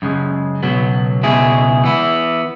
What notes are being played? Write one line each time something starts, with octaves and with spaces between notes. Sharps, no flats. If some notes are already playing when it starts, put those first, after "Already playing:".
F#2 C#3 G#3
C#2 B2 F#3 B3
C#2 B2 G#3 E4 G#4
E3 B3 E4